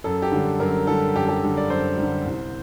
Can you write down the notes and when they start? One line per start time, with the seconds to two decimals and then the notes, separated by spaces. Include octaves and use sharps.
0.04 F#2 A4
0.22 G4
0.32 D3 G3
0.60 F#2 A#4
0.87 D3 G3 A4
1.15 F#2 G4
1.29 G4
1.42 D3 G3
1.57 D5
1.70 F#2 C5
1.97 D3 G3
2.26 C2